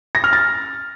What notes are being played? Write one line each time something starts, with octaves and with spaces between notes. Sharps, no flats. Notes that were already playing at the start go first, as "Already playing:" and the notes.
A#6
F6
A6